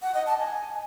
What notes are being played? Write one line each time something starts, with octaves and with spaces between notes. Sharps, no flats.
F#5
D#5
A5
G#5